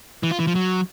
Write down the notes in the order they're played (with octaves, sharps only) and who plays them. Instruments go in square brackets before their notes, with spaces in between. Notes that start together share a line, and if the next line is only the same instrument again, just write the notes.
[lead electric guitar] E3
F4
E3
F3
F#3